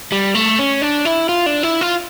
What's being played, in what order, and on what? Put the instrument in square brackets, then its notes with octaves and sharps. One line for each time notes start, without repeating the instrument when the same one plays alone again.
[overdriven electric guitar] G3
A3
C#4
D4
E4
F4
D4
E4
F4